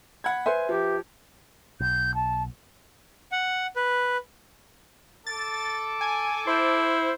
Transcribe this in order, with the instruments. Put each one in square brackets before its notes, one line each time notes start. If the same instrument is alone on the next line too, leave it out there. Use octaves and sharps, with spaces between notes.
[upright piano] F#5 B5 G#6
[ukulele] B4 C5 E5 [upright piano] G#5 C6
[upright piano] F3 [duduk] G4
[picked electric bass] B1 [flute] G6
[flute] A5
[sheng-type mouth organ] F#5
B4
[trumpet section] A4 D6 [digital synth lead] A6
[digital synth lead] G#5
[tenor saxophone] E4 [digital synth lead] C5